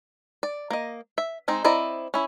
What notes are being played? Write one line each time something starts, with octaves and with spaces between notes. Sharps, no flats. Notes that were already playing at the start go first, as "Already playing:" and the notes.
D5
A#3 D#5
E5
G#3 C4 D#4
C4 E4 D5 D#5 A#5
C#4 E4